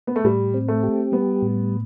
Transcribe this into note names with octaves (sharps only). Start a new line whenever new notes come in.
B3
A3
A2 G3
C4
A3
G4
G3 B3
A2